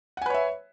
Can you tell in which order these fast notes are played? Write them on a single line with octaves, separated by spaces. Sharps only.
F#5 G#5 B4 C#5 E5